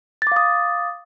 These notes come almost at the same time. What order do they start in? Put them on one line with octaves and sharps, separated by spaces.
A6 D6 F5 D#6